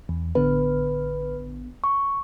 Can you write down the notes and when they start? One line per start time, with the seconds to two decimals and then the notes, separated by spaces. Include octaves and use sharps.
0.09 E2
0.35 A1 D3 B3 B4
1.84 C#6